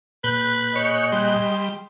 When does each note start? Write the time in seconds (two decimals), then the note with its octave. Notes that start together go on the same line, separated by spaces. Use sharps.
0.24 A#2 B4 F#6 G6
0.76 G#4 C#5 D#5
1.13 G3 C6